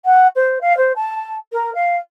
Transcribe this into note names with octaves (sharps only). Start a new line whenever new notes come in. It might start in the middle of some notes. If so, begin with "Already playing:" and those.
F#5
C5
F5
C5
A5
A#4
F5